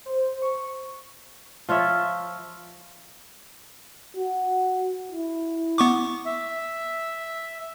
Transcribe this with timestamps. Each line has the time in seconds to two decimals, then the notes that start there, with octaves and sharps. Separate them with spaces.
0.06 C5
0.42 C#6
1.69 F3 F4 C#5 E5
4.17 F#4
5.11 E4
5.78 B3 C#6 D6
6.25 E5